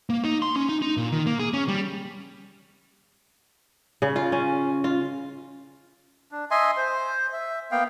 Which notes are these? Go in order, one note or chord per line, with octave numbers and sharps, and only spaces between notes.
A#3
D#4
C6
C#4
D#4
D#4
A#2
D#3
A#3
G#4
C#4
G3
C#3
F4
C#4
F4
D4
D#5 E5 G#5 C6
C5
E5
A#3 B3 F5 G5